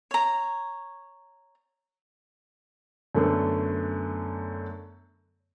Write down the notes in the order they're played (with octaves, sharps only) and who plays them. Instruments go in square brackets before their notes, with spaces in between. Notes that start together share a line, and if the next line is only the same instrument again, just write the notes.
[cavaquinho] C#5 A#5
[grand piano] F#2 D3 A3 B3